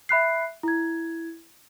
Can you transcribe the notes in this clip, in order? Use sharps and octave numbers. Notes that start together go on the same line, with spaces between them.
E5 B5 F#6 C7
E4 G#6